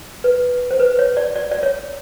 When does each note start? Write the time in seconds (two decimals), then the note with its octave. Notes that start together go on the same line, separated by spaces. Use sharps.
0.24 B4
0.71 C5
0.80 B4
0.99 C#5
1.17 D5
1.36 D5
1.52 D5
1.63 C#5